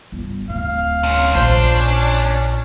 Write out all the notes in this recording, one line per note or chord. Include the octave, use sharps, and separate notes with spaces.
G1
D1 F5
C3 C#4
A#1 D4 C5
C#4